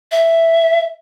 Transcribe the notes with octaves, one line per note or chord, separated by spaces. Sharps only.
E5